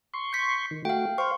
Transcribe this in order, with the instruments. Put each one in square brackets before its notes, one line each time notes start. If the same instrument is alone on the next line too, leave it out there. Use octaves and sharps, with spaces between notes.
[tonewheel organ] C6 C#6
[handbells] G6 B6
[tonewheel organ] D#3
[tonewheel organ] A3 F#4 [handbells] F5 G5
[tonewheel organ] C5 F5 [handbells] C6 C#6